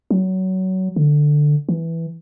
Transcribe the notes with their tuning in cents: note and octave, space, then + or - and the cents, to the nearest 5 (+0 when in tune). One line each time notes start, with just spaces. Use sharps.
F#3 +20
D3 +10
E3 +0